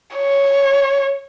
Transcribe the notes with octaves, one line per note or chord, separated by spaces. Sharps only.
C#5